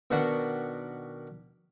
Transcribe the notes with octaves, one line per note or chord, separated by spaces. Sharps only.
B2 D#3 D4 F#4 F#5 B5